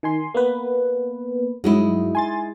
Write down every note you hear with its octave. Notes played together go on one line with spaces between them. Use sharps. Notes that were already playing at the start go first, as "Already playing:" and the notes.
D#3 G#5 C6
A#3 B3 B4
G2 F#3 G#3 D#4 E4
G#5 C6 A6